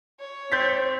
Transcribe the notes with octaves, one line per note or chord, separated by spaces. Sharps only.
C#5
C4 G6 A6 B6